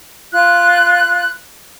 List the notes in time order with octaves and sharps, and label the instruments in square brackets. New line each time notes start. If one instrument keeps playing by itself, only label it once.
[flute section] F4 F#6